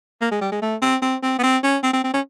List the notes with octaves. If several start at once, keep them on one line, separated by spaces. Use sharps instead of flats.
A#3
G#3
G3
G#3
A3
C4
C4
C4
B3
C4
C#4
C4
C4
C4
C#4